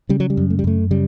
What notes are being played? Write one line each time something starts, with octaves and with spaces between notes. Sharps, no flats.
C#3 G3
F#3
G3
F#2
A3
G3
F#2 A3
C#3 G3